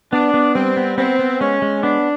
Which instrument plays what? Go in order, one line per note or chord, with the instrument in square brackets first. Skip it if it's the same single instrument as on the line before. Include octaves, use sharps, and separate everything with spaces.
[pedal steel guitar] B3 [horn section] D4
[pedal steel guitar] B3
[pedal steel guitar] G3 [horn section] C4
[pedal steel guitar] B3
[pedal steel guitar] B3 [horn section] C4
[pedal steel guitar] B3
[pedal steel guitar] G#3 [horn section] C#4
[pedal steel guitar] G#3
[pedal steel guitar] B3 [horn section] D4